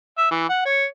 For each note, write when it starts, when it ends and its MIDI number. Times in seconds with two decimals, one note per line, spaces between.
0.17 0.28 76
0.31 0.46 52
0.49 0.62 78
0.65 0.85 73